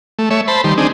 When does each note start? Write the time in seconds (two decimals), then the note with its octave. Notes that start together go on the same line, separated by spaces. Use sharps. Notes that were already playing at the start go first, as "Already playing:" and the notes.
0.19 A3
0.30 A3 C#5 E5
0.48 C5 A5 B5
0.64 D#3 G3 C6
0.78 C4 D4 D#4 G#4